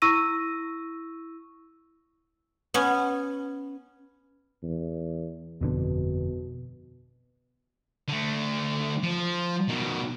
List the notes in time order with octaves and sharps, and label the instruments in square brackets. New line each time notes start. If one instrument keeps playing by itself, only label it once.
[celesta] E4 C#6 E6 A#6 D#7
[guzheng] B3 C#4
[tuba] E2
[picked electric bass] G1 F2 D3 [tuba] B2
[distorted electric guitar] D3 A3
F3
B2 D#3